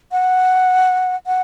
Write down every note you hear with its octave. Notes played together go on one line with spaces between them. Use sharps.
F#5
F#5